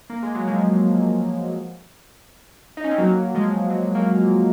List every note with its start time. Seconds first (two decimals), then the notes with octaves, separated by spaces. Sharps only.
0.10 A#3
0.23 G#3
0.35 F#3
0.47 F3 G#3
2.77 D#4
2.84 C#4
2.91 C4
2.98 F#3 A#3
3.35 F3 G#3
3.70 F#3
3.95 F#3 A#3